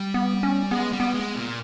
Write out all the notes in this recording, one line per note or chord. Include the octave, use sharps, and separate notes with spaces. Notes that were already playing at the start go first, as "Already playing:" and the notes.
Already playing: G3
B3
C#4
G#3 B3
G3
B3
G#3
A#2